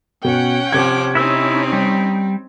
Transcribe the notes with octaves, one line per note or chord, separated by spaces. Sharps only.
B2 C#4 F#5 G5
C3 F3 D6 G#6
C4 C#4 D#4 E4 E6
G3